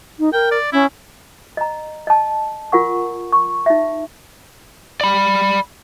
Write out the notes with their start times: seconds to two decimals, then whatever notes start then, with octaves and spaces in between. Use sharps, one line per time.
0.19 D#4
0.33 A#4 G5
0.51 D5
0.73 C#4 E4
1.57 D#5 A#5
2.07 D#5 A5
2.72 F4 A#4 F#5 C#6
3.32 C#6
3.66 D#4 E5
5.01 D5 B5